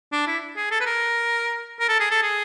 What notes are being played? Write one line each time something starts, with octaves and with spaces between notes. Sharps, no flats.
D4
E4
G#4
A4
B4
A#4
A#4
A4
G#4
A4
G#4